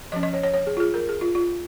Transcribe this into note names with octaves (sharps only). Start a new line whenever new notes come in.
F3 C#4 D#5
D#5
C#5
C#5
C#5
G#4
F4
G#4
A#4
G#4
F4
F4